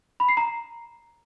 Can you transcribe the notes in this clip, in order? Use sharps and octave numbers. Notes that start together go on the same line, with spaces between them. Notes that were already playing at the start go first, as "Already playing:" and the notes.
B5
C7
A#5